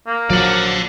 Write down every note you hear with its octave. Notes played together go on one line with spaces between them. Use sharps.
A#3
A#1 F3 F#3 D5 F#5